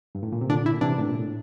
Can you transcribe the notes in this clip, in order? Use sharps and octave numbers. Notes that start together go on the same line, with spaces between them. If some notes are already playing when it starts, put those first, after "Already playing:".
G2
A2
A#2
C3
A#2 D3 D4
E4
C3 E3 D4
A2
A#2
A2